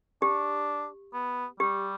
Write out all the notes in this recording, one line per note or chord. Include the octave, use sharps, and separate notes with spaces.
D4 G4
B3
G3 G4